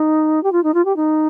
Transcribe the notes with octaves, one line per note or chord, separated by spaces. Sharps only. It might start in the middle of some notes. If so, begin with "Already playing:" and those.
Already playing: D#4
G4
F4
D#4
F4
G4
D#4